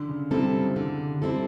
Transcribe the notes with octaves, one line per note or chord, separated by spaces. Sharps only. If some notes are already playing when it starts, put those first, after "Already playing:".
Already playing: D3
C#3
C3 G3 C4 E4 A4
C#3
D3
G3 C4 E4 A4